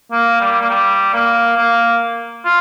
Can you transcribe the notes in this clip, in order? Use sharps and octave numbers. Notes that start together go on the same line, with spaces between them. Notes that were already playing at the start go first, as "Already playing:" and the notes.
A#3
G3
A#3
G3
A#3
A#3
F4